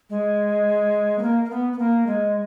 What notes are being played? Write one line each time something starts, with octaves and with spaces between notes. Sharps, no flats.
G#3
B3
A#3
A#3
B3
B3
A#3
G#3